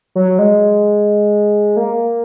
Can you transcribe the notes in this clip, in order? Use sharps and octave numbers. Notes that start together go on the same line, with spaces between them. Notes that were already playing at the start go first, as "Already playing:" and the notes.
F#3
G#3
A#3